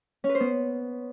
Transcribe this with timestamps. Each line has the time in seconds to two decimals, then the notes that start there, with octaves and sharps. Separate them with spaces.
0.24 C#4
0.29 B4
0.35 C5
0.40 B3